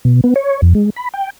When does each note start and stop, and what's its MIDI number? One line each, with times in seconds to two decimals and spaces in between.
0.05 0.21 47
0.24 0.34 59
0.36 0.61 73
0.62 0.73 41
0.75 0.90 56
0.96 1.09 83
1.13 1.30 79